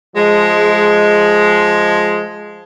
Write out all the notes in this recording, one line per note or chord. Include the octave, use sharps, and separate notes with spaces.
F3 G#3